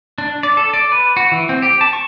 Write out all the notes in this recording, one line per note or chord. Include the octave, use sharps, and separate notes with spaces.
D4
D5
A4
D5
B4
F#4
E3
C4
G4
A5
C#6